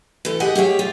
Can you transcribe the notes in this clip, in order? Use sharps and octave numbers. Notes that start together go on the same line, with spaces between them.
E3 A4
G4 G#4 D#5 F#5 G#5
G4 G#4 C#5 E5
F4